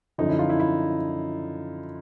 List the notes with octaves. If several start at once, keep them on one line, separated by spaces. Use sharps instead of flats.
F#2 D3 F3 D#4
E4
F4
E4
E4